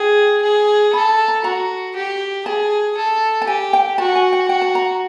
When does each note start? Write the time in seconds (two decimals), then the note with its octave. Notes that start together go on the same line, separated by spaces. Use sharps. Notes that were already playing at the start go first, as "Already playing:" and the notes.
Already playing: G#4 G5
0.43 G#4
0.93 A4 B5
1.28 A#5
1.44 F#4 A#5
1.96 G4
2.46 G#4 A5
2.97 A4
3.42 A5
3.47 G4 G#5
3.73 G5
3.98 F#4 A5
4.15 G#5
4.33 G5
4.49 F#4 G5
4.62 A5
4.75 A#5